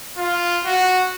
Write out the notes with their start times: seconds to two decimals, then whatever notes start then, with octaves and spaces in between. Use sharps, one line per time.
0.17 F4
0.65 F#4